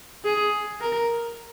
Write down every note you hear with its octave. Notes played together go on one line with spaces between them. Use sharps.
G#4
A#4